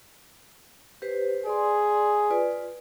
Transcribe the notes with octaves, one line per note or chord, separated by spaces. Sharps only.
G4 B4 C5
G#4 D5 C6
F4 B4 D5